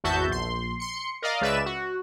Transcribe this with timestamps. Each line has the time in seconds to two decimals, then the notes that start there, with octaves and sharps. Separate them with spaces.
0.04 G#1 E2 F#4 E5 A5 G6
0.28 A#1 C6
0.80 C6 C#7
1.22 A#4 D5 D#5 F5
1.41 C#2 C#3 B4 D5 E5 E7
1.66 F#4